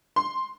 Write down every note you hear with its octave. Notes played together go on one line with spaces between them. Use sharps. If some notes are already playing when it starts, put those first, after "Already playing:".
C6